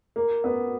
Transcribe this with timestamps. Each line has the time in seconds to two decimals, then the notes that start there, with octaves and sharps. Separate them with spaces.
0.16 A#3
0.44 B3